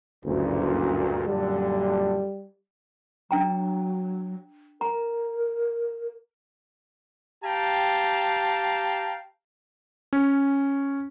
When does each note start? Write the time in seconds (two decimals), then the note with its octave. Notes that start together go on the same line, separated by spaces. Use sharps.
0.25 F#1 D2 G2 A#2
1.28 F#2 A#2 D3 G3
3.31 F#3 D4 G5 A#5
4.81 A#4 A#5
7.44 G4 F5 G5 A5 A#5
10.13 C#4